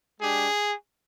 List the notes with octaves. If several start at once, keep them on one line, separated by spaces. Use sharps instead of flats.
G#3 D4 G4 G#4